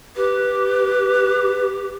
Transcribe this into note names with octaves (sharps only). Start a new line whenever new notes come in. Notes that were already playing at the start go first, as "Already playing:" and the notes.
G4 B4